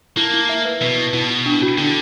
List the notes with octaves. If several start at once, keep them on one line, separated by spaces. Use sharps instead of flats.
A#3 E4
E4
E5
B4
B2 B4
E4
B2 E4
E4
D4
F#4
D3 D4